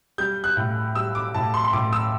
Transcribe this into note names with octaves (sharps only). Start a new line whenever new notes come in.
G3 G6
F#6
A2
G3 E6
D6
A2 A5
C6
C6
A2 D6
E6